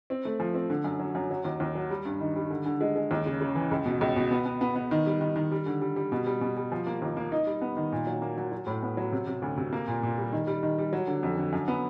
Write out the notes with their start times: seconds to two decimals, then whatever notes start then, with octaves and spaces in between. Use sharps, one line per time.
0.10 C4
0.25 A3
0.40 F3
0.54 C4
0.70 D3
0.84 F#2
0.99 F#3
1.15 F#2
1.31 F#3
1.45 D#2
1.60 D#2
1.75 F#3
1.90 G3
2.05 G2
2.21 D#3
2.36 G3
2.50 D3
2.66 D3
2.81 G#3
2.96 G#3
3.11 D#2
3.26 C#3
3.41 C#3
3.55 E3
3.71 C#2
3.86 B2
4.01 C#2
4.16 B2
4.31 B3
4.45 B3
4.61 B3
4.76 B3
4.91 D#3
5.06 G3
5.21 D#3
5.36 D#3
5.52 G3
5.66 D3
5.81 G3
5.96 G3
6.12 B2
6.27 G3
6.41 B2
6.57 G3
6.72 F3
6.87 A#3
7.02 D#2
7.17 A#3
7.32 D#4
7.47 G3
7.62 B3
7.77 D#3
7.92 A#2
8.07 F#3
8.22 A#3
8.37 F#3
8.52 F#3
8.67 A2
8.83 B3
8.97 F#3
9.12 C3
9.27 C3
9.42 D2
9.57 C3
9.73 A#3
9.88 A#2
10.03 A#2
10.18 G3
10.33 D#3
10.47 G3
10.63 D#3
10.78 G3
10.93 F#3
11.08 D3
11.23 F2
11.37 D3
11.53 F#2
11.68 B3